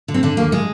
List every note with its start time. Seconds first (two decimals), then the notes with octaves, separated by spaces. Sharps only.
0.08 D3
0.14 C4
0.23 D3 D4
0.37 D#2 A#3
0.52 G#3